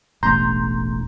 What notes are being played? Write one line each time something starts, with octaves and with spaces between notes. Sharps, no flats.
E1 A1 A#5 C6 G6